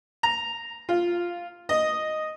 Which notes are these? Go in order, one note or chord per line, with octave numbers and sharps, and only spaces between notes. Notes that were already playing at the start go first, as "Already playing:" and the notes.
A#5
F4
D#5